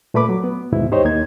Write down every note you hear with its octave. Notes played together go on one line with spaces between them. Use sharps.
A#2 A3 B4 B5 D6
F#3
B3
D#2 G#2 B2 D#3 E4
D#4 G4 C5 C#5 D#5
D#2 A#3 D#4 G#6